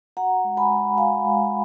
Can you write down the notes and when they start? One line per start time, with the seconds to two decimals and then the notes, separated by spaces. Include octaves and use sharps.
0.17 F#4 F#5 A#5
0.44 G#3
0.57 G#5 B5
0.70 G#3
0.98 F#4 F5 G#5
1.24 G#3